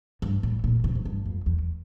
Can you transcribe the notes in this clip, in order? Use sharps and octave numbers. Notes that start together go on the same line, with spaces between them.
G2
A2
A#2
C3
G#2
G2
F2
E2